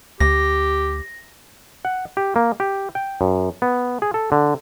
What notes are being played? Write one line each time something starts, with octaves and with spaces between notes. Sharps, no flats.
D2 G4 A#6
F#5
G4
A#3
G4
G5
F#2
B3
G#4
A4
D3